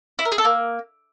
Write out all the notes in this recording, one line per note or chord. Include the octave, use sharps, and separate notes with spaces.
E4
A#4
G#4
A4
A#3